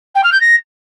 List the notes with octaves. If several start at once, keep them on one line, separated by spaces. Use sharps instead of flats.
G5
F6
G6
A#6